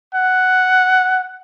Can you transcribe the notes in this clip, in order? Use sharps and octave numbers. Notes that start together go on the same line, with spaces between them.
F#5